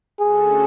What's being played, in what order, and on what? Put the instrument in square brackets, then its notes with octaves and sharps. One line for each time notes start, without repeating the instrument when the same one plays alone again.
[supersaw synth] D3 A3 C#4 F#4 A4 [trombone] G#4